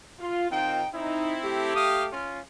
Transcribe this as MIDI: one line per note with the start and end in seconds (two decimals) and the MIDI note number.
0.19 0.49 65
0.51 0.82 51
0.51 0.82 60
0.51 0.87 63
0.51 0.82 65
0.51 0.87 79
0.93 1.74 60
0.93 1.35 63
0.93 1.74 64
1.42 2.10 57
1.42 2.10 67
1.74 2.04 77
1.74 2.04 87
2.11 2.40 61
2.11 2.40 65